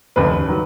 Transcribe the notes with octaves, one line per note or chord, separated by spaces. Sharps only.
F1 D#2 C#3 B4
D#3 F#3